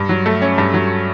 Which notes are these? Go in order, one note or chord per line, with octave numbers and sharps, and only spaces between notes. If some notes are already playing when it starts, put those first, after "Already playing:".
Already playing: G2
F#3
A3
C#4
G2
F#3